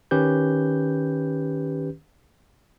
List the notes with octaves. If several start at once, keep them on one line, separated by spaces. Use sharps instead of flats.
D#3 C#4 G4 B4 G6